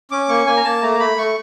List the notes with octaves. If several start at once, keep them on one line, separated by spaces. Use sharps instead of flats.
C#4 D6
A#3 C#6
A#3 G#5
A#5
A#3 A5
A3 A#5
A3 B5
A3 C#6